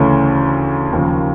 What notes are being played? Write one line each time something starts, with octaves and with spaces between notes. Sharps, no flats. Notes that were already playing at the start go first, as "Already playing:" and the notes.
Already playing: D2 C#3 E3 A3 C#4
D#2 C#3 F3